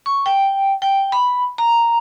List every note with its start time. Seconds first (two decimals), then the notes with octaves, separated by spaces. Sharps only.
0.06 C#6
0.26 G5
0.82 G5
1.12 B5
1.58 A#5